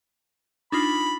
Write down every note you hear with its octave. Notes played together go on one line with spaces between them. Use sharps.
D4 D#4 F4 B5